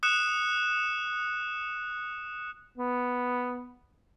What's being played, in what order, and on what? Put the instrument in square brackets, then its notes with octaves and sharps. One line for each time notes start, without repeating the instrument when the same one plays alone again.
[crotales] D#6 F#6 C#7 E7
[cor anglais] B3